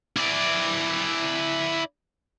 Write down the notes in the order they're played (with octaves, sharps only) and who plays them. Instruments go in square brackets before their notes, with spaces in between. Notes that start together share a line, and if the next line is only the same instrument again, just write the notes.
[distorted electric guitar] E4 D5